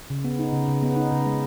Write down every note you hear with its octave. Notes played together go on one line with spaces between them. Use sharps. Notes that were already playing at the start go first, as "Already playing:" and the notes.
C#3
B3
D#4
C#3
C#3
B3
D#4
C#3
G#3